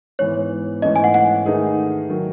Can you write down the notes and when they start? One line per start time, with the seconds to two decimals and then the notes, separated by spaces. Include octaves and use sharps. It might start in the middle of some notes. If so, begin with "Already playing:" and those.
0.19 G#2 E3 B3 C#5
0.82 G#2 E3 A3 C#4 D#5
0.96 G#5
1.04 F#5
1.14 F#5
1.46 D#3 A3 D#4 G#4 B4
2.10 D#3 F#3